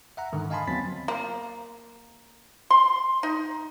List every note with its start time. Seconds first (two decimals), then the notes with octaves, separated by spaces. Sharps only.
0.17 E5 F#5 A#5
0.33 G#2 D3 D#3
0.50 D#5 F5 G#5 A5 B5 C6
0.67 F#3 B3 C4 B5 A6 B6
1.08 A#3
2.70 C6
3.23 D#4